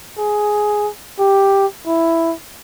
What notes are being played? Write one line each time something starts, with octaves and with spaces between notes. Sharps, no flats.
G#4
G4
E4